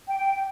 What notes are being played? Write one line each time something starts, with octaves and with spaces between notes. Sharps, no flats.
G5